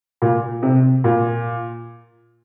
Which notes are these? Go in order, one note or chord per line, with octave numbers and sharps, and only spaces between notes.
A#2
C3
A#2